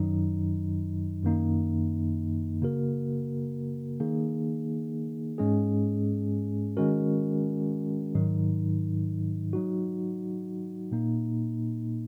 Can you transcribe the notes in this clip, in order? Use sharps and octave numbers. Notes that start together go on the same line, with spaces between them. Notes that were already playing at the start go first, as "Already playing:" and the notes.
Already playing: F#2 D#3 F#3 D#4
F#2 D#3 A#3 D#4
C#3 A#3 F#4 A#4
D#3 A#3 D#4 G#4
G#2 G#3 C#4 G#4
D#3 G#3 C#4 F#4 A#4
G#2 D#3 F#3 D#4
F#3 D#4 F#4
A#2 A#3 D#4